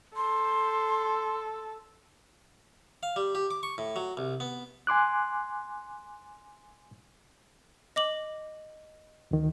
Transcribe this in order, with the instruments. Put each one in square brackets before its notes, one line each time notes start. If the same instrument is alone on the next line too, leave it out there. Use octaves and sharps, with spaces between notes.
[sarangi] A4 [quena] C6
[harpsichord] F5
G3
G4
D6
C#6
A2
F#3
C2
B3
[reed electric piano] G#5 C6 D6 F#6
[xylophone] D#5 D6 F#7
[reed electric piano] D2 D#3